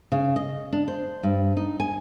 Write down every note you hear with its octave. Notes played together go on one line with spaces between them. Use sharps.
C#3
D#5
D4
C5
G2
D#4
G#5